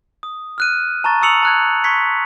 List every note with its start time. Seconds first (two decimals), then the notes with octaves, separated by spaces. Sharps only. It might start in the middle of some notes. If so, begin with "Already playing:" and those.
0.23 D#6
0.58 F6 F#6 D#7
1.04 A5 A#5 C#6 A6
1.22 C#6 D#6 E6 C#7 F7 F#7
1.43 A5 F#6 G#6
1.84 C6 C#6 G#6 B6 C#7